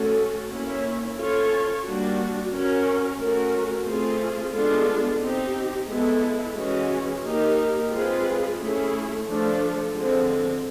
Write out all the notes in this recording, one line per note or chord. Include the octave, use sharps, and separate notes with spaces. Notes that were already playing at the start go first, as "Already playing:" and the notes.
Already playing: A3 C#4 F#4 A4
A#3 C#4 E4
C#4 F4 A4 C#5
G3 A#3 D4 F#4
C#4 F#4 A#4
A3 C#4 F#4 A#4
A3 C4 F4 G#4
G#3 B3 D4 F4 A4
C4 D#4 G4
G#3 B3 E4 A4
E3 G#3 C#4 F#4
A#3 D#4 G4 A#4
G#3 C4 F4 G#4 B4
A3 C#4 E4 G#4
F3 A3 D4 F4 A4
D3 F3 G#3 C4